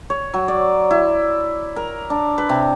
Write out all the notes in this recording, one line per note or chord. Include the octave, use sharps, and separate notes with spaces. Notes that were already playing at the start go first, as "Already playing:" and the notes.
C#5
F#3
D5
E4
A#4
D4
B4
C3